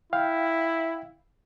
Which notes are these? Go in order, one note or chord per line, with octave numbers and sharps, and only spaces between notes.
E4 F5 G5